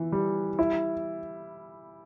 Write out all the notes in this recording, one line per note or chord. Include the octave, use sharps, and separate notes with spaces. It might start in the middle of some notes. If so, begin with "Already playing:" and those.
Already playing: E3
G3
E4